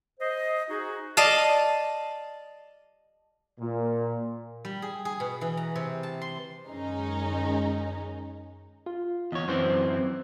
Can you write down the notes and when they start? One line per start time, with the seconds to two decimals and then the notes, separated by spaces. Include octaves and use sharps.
0.19 C5 D#5
0.69 D#4 F#4 G#4
1.17 D5 D#5 F5 A5
3.60 A#2
4.65 G3
4.82 G#4
5.05 G#4
5.20 B2
5.41 E3
5.57 A#5
5.75 C3
6.03 A5
6.22 C6
6.66 F#2 D#3 G#3 C#4 D#4
8.86 F4
9.32 E2 C#5 D#5
9.48 F#2 E3 C4 C5